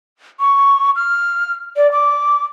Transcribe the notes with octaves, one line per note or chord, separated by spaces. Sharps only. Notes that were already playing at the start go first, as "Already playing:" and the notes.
C#6
F6
D5
D6